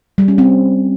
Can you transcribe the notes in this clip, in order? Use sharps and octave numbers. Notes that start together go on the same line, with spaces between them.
G3
C#4
C4